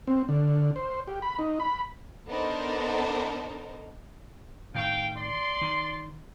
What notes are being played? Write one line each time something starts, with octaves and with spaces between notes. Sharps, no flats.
C4
D3
C5
G4
B5
D#4
B5
B3 D4 D#4 A4 A#4 C5
A2 D#3 F5 G5
D5 C6
D#3